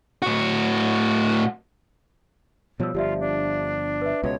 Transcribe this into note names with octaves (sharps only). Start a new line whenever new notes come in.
A2 F#4
B2 F3 G3 C#5 E6
G1 F3 F4 G4 D5 E5
D4
B4 E5
C#2 B2 C#5